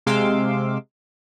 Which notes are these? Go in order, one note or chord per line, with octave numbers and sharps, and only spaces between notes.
C3 G#3 F5 C6 D6 E6